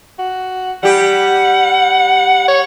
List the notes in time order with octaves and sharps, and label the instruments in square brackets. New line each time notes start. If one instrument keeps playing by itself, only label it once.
[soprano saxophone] F#4
[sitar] G3 G4 [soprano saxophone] F#5
[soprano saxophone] C#5